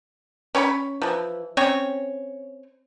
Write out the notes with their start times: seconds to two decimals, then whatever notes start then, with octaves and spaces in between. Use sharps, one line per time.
0.55 C#4 C#5 G#5 B5
1.02 E3 F3
1.57 C4 C#4 C#5